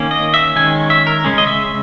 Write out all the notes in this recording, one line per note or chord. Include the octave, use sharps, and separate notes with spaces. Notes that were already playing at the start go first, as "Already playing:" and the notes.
Already playing: D#3 A#3 C#4
D#5
E5
D#3 G#3 C#4 G#5
E5
A#4
C#3 G#3 C#4
D#5
E5